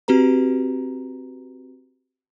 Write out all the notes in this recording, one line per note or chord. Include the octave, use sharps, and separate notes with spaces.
C4 F#4 G4 B4 A#5